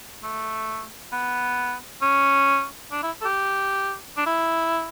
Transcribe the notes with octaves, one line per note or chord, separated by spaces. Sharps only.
A3
B3
C#4
D4
E4
A4
G4
D4
E4